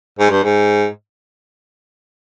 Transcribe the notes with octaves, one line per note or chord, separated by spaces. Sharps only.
G#2
G2
G#2